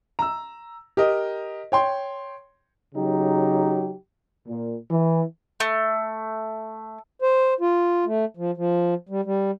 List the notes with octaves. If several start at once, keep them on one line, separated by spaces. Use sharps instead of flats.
A#5 E6
G4 A#4 D#5
C#5 G5 C6
C#3 F#3 D#4 G4
A#2
E3
A3
C5
F4
A3
F3
F3
G3
G3